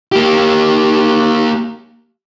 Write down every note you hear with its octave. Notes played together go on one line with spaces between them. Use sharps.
A#3 G4